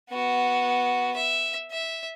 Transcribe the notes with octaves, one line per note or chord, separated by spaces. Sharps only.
B3 F#4
E5
E5